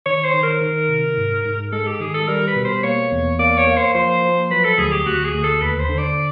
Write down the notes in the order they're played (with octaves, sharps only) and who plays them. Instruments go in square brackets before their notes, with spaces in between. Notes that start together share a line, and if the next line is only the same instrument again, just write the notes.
[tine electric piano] D#3 [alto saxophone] C#5
[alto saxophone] C5
[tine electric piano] D#3
[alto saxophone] A#4
[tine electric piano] D#3
C3
G#2
G#2
[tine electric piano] G#3 [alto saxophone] A4
[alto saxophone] G4
[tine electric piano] D#3 [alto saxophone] G#4
[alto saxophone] A4
[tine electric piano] G3 [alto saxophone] A#4
[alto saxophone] B4
[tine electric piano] B2
[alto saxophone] C5
[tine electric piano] A#3 [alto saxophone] C#5
[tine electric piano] E2
[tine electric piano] A#3 [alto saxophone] D5
[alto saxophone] C#5
[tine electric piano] A#3
[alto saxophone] C5
[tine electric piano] F3 [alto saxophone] C5
[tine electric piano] F3
[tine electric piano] F#3 [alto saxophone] B4
[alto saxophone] A4
[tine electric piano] D2 [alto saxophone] G#4
[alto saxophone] G4
[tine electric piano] D2 [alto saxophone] F#4
[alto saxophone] G#4
[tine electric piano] D2
[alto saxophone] A4
[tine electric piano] D#2 [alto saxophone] B4
[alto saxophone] C5
[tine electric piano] D3
[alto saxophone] D5